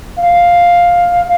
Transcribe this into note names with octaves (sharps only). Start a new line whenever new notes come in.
F5